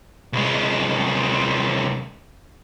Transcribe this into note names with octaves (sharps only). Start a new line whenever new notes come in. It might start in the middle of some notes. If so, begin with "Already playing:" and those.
C2 G#3